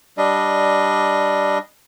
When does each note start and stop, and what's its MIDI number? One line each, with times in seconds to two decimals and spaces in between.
0.18 1.58 55
0.18 1.58 62
0.18 1.58 75